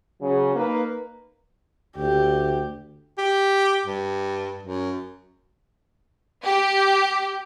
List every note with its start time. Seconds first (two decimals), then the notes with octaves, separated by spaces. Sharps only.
0.21 C#3 F#3
0.55 A#3 D#4 B4
1.97 D2 G4
3.18 G4
3.86 G2
4.63 F#2
6.43 G4